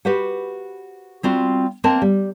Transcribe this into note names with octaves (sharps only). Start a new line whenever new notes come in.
F#4 G4 B4 C5 F#5
G3 C4 F4 F#4
A#3 C4 A#4 D#5 G5 A5
G3